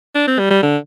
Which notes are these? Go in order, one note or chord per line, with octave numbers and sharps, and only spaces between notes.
D4
C4
G3
G3
D3